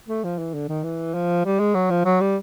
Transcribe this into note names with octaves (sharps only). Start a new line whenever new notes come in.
A3
F3
E3
D3
D#3
E3
F3
G3
G#3
F#3
F3
F#3
G3